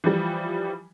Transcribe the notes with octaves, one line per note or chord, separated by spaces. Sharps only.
E3 F3 G3